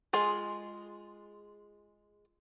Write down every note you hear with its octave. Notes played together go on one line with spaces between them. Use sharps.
G#3 F4 G#4 G#5